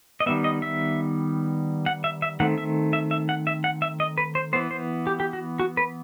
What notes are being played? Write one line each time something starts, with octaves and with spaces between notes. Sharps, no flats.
D#5
D#3 G3 B3 E5
D#5
E5
F#5
E5
E5
D#3 A3 C4 F#5
E5
E5
E5
F#5
E5
F#5
E5
D#5
B4
C5
E3 B3 C5
C5
G4
G4
F#4
F#4
B4